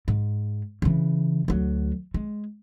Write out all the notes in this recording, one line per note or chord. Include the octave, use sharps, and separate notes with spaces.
G#2
C#3 E3
D2 F#3
G#3